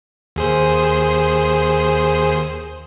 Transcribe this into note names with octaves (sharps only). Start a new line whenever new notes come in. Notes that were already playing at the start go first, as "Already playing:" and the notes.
D#2 G#4 C5